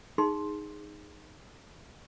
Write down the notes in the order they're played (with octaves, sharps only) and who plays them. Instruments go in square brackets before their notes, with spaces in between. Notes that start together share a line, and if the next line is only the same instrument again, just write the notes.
[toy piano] D#4 G#4 C6